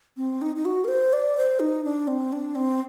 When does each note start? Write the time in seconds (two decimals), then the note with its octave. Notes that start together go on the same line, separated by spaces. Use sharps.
0.17 C4
0.42 D#4
0.56 D#4
0.65 F#4
0.84 A#4
0.88 C5
1.13 D5
1.37 C5
1.60 D#4
1.84 D4
2.07 C4
2.33 D4
2.55 C4